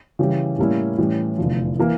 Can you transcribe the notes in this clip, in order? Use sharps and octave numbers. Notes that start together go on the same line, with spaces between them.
C#3 E3 G3 C#4 G4
A2 G3 A#3 C#4 E4
A2 E3 G3 C#4 G4
F1 E2 D3 F3
E3 A#3